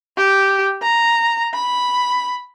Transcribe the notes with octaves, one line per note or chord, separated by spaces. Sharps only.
G4
A#5
B5